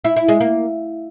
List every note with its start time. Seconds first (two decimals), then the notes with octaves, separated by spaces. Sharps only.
0.05 E4
0.16 E4
0.28 G#3
0.40 A#3